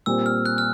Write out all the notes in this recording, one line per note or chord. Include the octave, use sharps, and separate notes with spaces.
A#2 G3 C4 E6
F6
F#6
F6